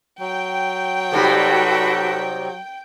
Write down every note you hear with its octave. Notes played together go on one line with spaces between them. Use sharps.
F#3 G5
C3 G3 D#4 F#4 A4 B4